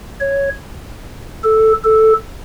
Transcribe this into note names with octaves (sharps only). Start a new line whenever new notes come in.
C#5
A4
A4